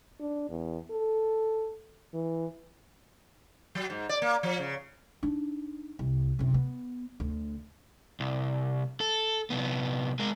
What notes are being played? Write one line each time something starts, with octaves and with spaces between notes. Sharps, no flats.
D4
E2
A4
E3
F#3
G#2
D5
A#3
F3
C#3
D4 D#4
C2
F#1 C3
B3
D2
C2
A4
C2 B3
G#3 A#4